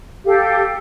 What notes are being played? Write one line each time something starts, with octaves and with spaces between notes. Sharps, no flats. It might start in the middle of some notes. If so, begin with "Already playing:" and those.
G4 A4 F5